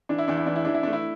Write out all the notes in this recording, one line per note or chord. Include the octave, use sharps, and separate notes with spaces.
E3 D4
E4
E2 D4
E4
E3 D4
E4
E3 D4
E4
A3 D4
E4